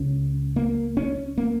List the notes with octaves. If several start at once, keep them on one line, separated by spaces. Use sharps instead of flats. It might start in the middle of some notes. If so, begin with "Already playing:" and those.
Already playing: C#2 C#3 C#4
A#3
C#4
A#3